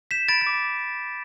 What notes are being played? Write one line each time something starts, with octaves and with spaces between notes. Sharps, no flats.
G6 B6 E7
B5 A6 D7
A6
D6